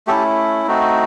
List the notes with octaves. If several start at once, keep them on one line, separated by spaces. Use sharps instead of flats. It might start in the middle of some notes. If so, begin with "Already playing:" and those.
A3 C#4 E4 G4 A4
A3 C4 D#4 F#4